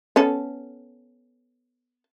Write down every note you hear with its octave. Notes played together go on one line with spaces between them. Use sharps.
B3 C#4 A4